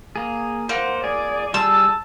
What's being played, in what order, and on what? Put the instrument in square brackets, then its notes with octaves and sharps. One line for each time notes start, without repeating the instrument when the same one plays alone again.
[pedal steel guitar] A#3 G#4
[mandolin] A#3 [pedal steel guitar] C5 [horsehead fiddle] F#5
[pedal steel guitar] G#4 [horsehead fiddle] D5
[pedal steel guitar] G3 G#4 [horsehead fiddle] A5 [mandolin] E6